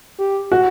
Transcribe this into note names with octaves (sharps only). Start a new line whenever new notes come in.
G4
F#4